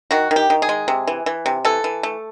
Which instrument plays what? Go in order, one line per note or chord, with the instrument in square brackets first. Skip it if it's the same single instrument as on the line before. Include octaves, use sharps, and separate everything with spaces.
[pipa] D#3 F#4
D#3
G4
D#3
G#4
G#3
C3
E3
E3
C3
E3 A4
E3
A3